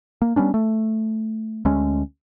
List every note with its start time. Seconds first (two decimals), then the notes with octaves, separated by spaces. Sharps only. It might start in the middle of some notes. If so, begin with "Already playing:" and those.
0.22 A#3
0.36 G3 B3 C#4 D4
0.54 A3
1.65 D2 G#3 C#4